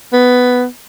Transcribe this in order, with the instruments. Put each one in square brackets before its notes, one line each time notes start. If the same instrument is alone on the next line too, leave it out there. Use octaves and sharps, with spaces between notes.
[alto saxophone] B3